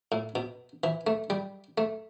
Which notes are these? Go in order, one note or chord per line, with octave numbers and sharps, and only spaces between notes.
A2
B2
E3
A3
G3
A3